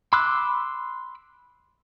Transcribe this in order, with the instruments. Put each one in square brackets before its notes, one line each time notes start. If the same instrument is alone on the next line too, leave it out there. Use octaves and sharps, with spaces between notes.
[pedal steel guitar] B5 C6 D6 E6 F#6